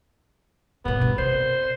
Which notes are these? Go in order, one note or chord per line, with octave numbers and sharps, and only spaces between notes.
G2 B2 B3
G2
C3 C5